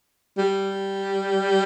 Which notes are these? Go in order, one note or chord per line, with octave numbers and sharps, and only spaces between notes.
G3